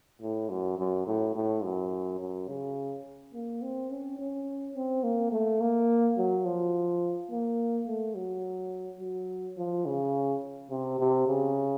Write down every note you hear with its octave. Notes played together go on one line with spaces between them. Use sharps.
A2
F#2
F#2
A2
A2
F#2
F#2
C#3
A#3
C4
C#4
C#4
C4
A#3
A3
A#3
F#3
F3
A#3
A3
F#3
F#3
F3
C#3
C3
C3
C#3